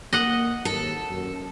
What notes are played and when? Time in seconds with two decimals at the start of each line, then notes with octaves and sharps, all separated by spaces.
0.13 A#3 D#5 F#5
0.65 D#2 A4
1.09 F#2